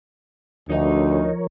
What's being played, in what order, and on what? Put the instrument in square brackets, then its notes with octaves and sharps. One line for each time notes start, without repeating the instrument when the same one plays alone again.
[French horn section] D2 [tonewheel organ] F3 A#4 C#5 [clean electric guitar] D#4 D#5